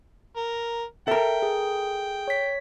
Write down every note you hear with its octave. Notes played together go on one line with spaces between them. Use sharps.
A#4
A4 A#4 E5 G5
G#4
C#5 B6